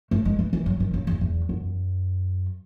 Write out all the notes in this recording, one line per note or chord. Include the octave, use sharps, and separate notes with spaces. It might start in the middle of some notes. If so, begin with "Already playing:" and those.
A3
G#3
E3
E3
F#3
D#3
C#3
E2
E2
F#2